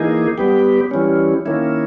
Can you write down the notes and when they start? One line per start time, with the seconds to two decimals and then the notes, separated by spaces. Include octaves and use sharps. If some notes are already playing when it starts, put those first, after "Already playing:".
Already playing: E3 A#3 D#4 G#4
0.38 G3 B3 G4
0.91 E3 G3 C#4
1.46 D#3 A#3 C#4 E4